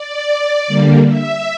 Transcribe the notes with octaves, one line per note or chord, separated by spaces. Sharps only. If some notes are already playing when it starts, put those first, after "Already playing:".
Already playing: D5
D3 G3 A#3
E5